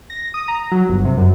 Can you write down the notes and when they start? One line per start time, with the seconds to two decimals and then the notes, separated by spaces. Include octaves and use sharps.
0.10 A#6
0.34 D#6
0.48 A#5
0.71 F#3
0.89 G1
1.05 C3
1.17 F#2